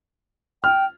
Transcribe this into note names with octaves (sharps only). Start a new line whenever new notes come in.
G5 F6